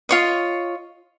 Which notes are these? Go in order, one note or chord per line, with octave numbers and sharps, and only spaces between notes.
F4 C#5 D#5